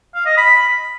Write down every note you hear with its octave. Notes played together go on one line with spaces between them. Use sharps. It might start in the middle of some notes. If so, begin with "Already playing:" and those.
F5
D#5
B5